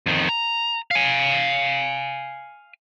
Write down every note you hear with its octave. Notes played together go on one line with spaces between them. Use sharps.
F2 D#3
A#5
F5 G#5